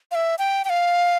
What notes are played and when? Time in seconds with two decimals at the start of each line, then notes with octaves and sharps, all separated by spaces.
0.11 F5
0.15 E5
0.39 G5
0.65 G5
0.70 F5